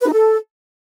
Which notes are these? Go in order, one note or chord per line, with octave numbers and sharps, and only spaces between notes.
B4
D#4
A4